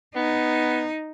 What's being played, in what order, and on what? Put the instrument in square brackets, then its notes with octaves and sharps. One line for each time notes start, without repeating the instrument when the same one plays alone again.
[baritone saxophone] B3 [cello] D#4